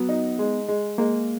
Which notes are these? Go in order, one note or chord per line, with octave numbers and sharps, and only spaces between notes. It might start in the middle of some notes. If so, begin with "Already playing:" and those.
Already playing: F#3 B3
D#4
G#3
G#3
G#3 A#3